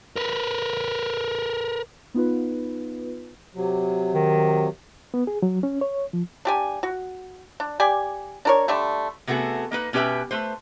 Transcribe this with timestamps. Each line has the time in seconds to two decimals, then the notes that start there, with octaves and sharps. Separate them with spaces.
0.16 A#4 B4
2.14 B3 D#4 F4 B4
3.55 C3 F#3
4.14 D#3
5.14 B3
5.27 G#4
5.42 F#3
5.63 C#4
5.81 C#5
6.13 F3
6.45 D4 G4 G#5
6.83 F#4
7.60 D4
7.80 G4 D5 G#5
8.45 D4 A#4 C#5
8.68 D3 G3 A3 D4
9.27 C3 A3 B3 F#4 G#4
9.72 A#3 D#4 B4
9.93 B2 C#4 G4 B4 E5 G5
10.31 A3 B4 C5